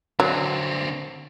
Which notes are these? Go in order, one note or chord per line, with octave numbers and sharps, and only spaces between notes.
D3 F#3 C4